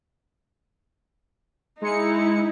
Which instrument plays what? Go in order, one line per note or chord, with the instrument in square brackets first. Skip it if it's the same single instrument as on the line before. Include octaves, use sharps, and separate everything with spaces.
[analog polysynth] G#3 C#7 [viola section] D#4 E4